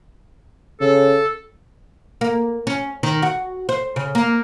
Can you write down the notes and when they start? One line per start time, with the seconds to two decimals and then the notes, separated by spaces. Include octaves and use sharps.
0.81 C#3 A4
2.21 A#3
2.67 C#4
3.03 D#3
3.22 F#4
3.69 C5
3.96 C#3
4.15 A#3